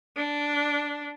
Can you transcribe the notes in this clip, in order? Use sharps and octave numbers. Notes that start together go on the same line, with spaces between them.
D4